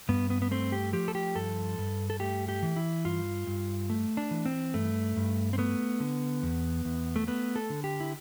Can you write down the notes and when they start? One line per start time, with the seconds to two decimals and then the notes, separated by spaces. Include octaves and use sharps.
0.09 G2 B3
0.30 B3
0.42 B3
0.51 A3 C4
0.72 G4
0.93 F3 G4
1.08 A4
1.15 G4
1.36 G2 A4
1.78 G2
2.10 A4
2.20 A3 G4
2.48 G4
2.62 E3
2.76 E4
3.05 G2 F4
3.47 G2
3.90 A3
4.17 D4
4.31 E3
4.46 C4
4.74 G2 A3
5.16 G2
5.53 C4
5.58 A3 B3
6.00 D3
6.43 E2
6.85 E2
7.16 A3
7.27 A3 B3
7.56 A4
7.70 D3
7.84 G4
8.00 E4